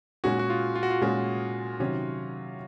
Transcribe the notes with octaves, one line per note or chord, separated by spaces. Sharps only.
A#2 G#3 C#4 F#4 G#4
F#4
F4
F4
F#4
F4
A#2 G#3 C#4 F#4 G#4
C3 D#3 F#3 C#4